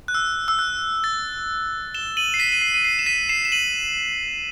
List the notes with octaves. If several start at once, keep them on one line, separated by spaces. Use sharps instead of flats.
F#6
E6
E6
F#6
A6
E7 G7
D#7 F#7
C7
B6 D#7
D#7
C7
D#7
C7
E7
B6 D#7
C7 E7
E7
D#7 F#7